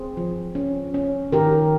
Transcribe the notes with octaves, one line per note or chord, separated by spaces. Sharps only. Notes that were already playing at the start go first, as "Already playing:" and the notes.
Already playing: C4 G#4 C5
F3
C#4
C#4
D#3 G4 A#4